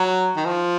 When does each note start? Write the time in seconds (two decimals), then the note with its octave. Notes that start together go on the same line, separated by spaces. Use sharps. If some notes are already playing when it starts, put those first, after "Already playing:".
Already playing: F#3
0.36 D#3
0.45 F3